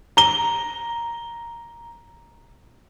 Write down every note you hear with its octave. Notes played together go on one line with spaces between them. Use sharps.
A#5 G7